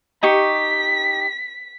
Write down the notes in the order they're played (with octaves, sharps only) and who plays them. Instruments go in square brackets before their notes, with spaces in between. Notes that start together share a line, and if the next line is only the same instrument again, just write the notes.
[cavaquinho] D#4 G4 C#6 [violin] B6